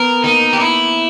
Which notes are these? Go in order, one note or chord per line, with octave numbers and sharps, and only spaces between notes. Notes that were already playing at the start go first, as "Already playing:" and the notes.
Already playing: B3 A#4
A#3 D#4
G4
E4